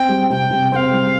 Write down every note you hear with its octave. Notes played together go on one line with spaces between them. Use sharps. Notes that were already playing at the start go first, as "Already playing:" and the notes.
Already playing: C4 G5
G3
C3 G5
C3
C4 F5 G5
G3